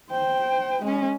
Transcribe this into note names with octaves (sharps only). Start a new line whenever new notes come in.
C5 G5
G#3 C#4